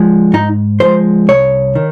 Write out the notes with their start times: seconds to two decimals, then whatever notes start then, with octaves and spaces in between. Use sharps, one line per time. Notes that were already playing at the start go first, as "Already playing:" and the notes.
Already playing: F3 G#3
0.33 G#2 D#4
0.80 F3 G#3 C5
1.29 C2 C#5
1.75 D#3